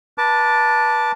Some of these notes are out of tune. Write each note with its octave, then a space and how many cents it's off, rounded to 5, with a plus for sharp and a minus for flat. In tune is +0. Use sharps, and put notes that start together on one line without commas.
B4 -30 A5 +0 D6 +0